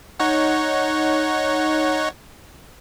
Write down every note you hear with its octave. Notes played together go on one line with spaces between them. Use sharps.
D#4 C#5 F#5